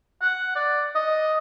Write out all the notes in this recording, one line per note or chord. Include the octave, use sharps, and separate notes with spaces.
F#5
D5
D#5